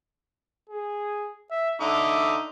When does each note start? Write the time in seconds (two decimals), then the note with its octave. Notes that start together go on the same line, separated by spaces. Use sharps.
0.70 G#4
1.51 E5
1.81 D3 D#4 E5 D6